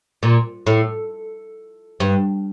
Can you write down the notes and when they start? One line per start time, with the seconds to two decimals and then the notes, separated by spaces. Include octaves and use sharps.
0.23 A#2
0.67 A2
2.00 G2